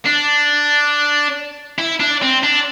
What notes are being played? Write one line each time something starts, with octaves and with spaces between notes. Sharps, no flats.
D4
E4
D4
C4
D4